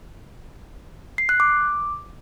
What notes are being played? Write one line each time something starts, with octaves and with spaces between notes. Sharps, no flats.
C7
F#6
D6